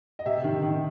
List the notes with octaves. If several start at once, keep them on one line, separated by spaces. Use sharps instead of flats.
D#5
C3 E5
D#3
D#3